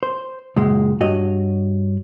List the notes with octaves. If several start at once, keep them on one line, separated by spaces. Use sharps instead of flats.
C5
C#2 F#2 A#2 G#3
G2 F#4 C#5 D#5